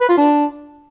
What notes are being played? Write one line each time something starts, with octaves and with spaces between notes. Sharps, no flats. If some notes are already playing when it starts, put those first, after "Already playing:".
B4
F4
D4